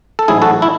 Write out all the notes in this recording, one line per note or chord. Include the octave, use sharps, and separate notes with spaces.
A4
A1 G#2 F#3 A3 E4 G#4
F#4 A4
E4